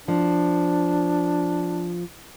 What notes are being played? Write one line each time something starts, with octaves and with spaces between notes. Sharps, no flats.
F3 D4